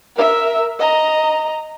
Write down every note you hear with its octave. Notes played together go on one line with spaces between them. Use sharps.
A#4 E5
D#5 A#5